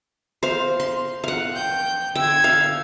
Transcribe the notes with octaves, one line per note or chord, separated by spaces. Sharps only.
C5 F5
C6
F5 F#5
G5 G6
D3 G5 E6 G#6
F5